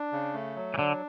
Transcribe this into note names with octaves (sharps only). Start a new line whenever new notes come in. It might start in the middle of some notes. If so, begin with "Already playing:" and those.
Already playing: D4
C#3
A3
F#3
E3
D3 D4